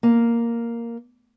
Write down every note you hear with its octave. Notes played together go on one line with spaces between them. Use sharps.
A#3